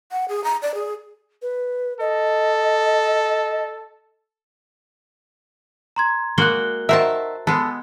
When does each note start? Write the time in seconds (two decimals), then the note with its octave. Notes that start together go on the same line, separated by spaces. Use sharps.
0.12 F#5
0.29 G#4
0.44 A#5
0.62 D5
0.75 G#4
1.42 B4
2.00 A4 D#5
5.96 A#5 C6 G#6
6.38 G#3 A#3 F#4 F#6 G7
6.89 D#3 F#4 A#4 C5 E5 A5
7.47 G#3 B3 A4